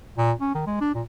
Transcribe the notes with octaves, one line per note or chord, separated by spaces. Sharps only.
A#2
C#4
D#3
G#3
D4
A#2